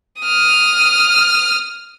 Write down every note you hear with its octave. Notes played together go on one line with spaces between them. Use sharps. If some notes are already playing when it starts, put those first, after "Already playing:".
D#6 F6